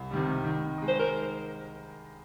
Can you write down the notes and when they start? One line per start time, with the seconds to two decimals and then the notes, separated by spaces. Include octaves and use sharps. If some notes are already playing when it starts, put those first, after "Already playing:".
Already playing: C2
0.11 C3 D#3 G3
0.44 D#3
0.78 G#3 D#4
0.88 C5
0.99 A#4